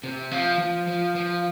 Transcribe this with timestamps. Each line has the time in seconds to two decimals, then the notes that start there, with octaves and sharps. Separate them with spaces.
0.04 C3
0.31 F3
0.59 F3
0.87 F3
1.15 F3